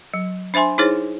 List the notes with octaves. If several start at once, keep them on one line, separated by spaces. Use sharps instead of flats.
F#3
D4 C5 E5 G#5 C6
D#4 E4 G#4 C5 C#5